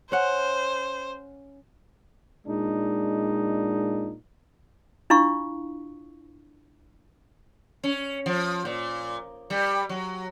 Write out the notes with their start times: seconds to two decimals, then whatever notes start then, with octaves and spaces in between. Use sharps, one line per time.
0.12 C#4 C5 F#5
2.47 A#2 G#3 D4 D#4
5.10 D4 E4 F4 F5 C#6
7.84 C#4
8.26 F3
8.65 A#2
9.50 G3
9.89 F#3